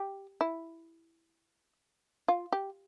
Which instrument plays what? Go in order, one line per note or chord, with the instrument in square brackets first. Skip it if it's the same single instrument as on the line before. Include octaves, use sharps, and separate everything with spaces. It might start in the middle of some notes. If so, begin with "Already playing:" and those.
Already playing: [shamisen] G4
E4
F4
G4